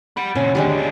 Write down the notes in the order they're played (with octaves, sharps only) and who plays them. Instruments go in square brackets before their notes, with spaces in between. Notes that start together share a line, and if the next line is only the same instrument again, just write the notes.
[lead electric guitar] G4 B5 [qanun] F#5
[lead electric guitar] A#2 C#3 [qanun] C#4
[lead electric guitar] D#2 D3 [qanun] G#3 D4 G4
[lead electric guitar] F4 G#4